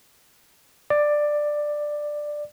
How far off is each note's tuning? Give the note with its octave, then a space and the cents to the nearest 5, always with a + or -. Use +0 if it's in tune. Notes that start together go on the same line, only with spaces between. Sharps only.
D5 +10